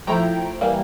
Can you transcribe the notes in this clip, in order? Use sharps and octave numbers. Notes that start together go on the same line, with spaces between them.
F3 A3 E4 G5 A#5
E3 G3 A#3